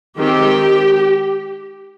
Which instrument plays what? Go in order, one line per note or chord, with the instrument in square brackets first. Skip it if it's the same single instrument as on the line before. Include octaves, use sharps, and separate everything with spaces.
[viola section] D#3 G#3 C4 G4